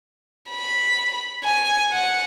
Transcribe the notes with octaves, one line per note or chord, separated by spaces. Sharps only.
B5
G#5
F#5